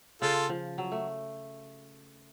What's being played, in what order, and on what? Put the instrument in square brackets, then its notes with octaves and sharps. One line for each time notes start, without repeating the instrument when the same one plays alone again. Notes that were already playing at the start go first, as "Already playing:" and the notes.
[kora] C#3 [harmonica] F4 A4
[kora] F3
F#3
A3